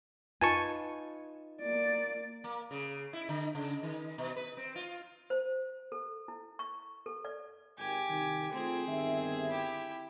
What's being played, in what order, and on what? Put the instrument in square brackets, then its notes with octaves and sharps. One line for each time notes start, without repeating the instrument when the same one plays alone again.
[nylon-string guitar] D#4 F4 B4 [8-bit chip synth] G#5 A5 C#6
[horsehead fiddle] A#3 D5
[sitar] A#3
C#3
E4
D3
C#3
D#3
B2
B4
C4
F4
[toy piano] C5
A4
E4
C#6
A4
D5
[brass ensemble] G#1 [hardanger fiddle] G4 G#5
[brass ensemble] C2 D#3
[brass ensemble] A3 F4 [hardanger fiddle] C4 G#4
[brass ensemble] G1 D#3 E5
[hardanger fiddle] E4 G4